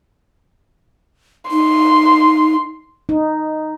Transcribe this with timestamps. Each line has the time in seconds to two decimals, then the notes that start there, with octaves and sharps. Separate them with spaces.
1.51 D#4 C6
3.09 D#4